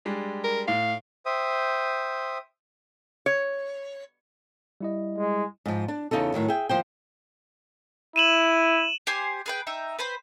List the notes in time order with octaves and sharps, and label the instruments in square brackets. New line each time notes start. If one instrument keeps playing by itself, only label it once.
[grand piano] G3 G#3 D4
[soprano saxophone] A#4
[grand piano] A2 [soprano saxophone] F5
[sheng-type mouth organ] C5 E5 G5 D#6
[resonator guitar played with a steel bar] C#5
[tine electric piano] G3 E4 D#5
[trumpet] G#3
[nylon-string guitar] G#2 F3
D4
E2 C#3 D#4 F4 A4
A2 D#3 F#3
G#4 E5 G5
D#2 F3 C5 G5
[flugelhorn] E4 [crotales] D#7 E7 F#7
[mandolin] G4 C5 G#5 C6
G#4 B4 G5
D#4 E5 G5
B4 C5 B5